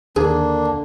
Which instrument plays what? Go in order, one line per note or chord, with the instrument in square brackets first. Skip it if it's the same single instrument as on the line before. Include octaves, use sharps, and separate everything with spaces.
[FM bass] D#2 [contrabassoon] D3 [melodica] A#3 D4 [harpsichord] G#4